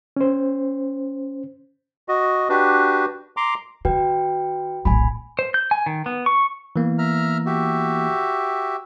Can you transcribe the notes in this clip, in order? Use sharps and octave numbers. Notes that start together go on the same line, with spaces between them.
C#4 C5
F#4 D#5
D4 F#4 G4 B4
A#5 C6 D6
D#3 F#4 B4 G5
D1 A#1 G#5 B5
C5
G6
G#5
D#3
B3
C#6
E3 A#3 B3
E5 A#5 F6
F#4 G4 E5